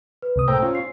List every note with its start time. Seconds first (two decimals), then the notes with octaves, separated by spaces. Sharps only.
0.22 B4
0.36 C#2 C3 D#6
0.48 A2 A#4 C5 G5 E6
0.62 C#4 F4
0.75 C7